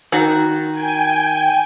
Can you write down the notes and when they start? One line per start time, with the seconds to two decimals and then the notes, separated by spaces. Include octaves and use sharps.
0.12 D#3 F#4
0.71 G5 G#5